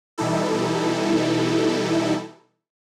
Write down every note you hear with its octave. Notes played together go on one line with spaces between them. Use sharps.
B2 E3 G3 D#4 E4 A4